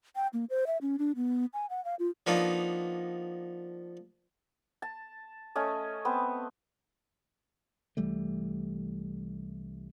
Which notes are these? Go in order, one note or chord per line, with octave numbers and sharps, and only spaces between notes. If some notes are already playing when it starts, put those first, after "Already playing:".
G5
A#3
C5
E5
C#4
D4
B3
G#5
F#5
F5
F4
F3 A#3 B3 D4 D#4
A5
A3 C#4 D#5
B3 C4 B4
C2 E3 G3 A3